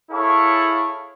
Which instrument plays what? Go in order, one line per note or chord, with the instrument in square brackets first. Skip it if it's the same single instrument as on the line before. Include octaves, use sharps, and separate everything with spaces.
[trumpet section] E4 G#4 A4 C#5 F5 C#6